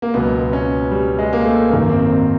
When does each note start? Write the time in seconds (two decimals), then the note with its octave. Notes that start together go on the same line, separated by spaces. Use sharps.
0.02 A#3
0.14 C#2 B2 F#3 B3
0.53 C#4
0.91 G3
1.18 G#3
1.33 A#3
1.45 A3
1.70 G#1 F#2 D#3 A#3
1.89 C4
2.10 C4